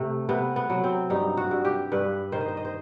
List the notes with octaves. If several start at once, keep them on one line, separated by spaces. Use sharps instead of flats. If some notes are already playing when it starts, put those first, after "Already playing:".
Already playing: C3 A3
C3 B3
B3
F#3
C4
G2 D#4
F#4
G2
G4
G2 B4
D#3 C5
D#5
C5
D#5
C5